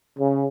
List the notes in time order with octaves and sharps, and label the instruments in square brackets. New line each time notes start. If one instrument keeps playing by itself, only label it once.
[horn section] C#3